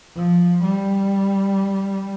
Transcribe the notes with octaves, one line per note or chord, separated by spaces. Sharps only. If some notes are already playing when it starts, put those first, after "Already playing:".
F3
G3